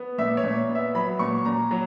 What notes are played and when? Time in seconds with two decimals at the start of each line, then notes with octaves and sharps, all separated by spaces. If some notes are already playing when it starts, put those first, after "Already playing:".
Already playing: B3
0.18 A#2 E5
0.37 C#5
0.44 A#2
0.69 B3
0.75 E5
0.95 F#3 B5
1.19 A#2 C#6
1.45 A#2 A#5
1.71 F#3